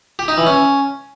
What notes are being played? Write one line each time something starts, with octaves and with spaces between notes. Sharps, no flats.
G4
D#4
E3
C#4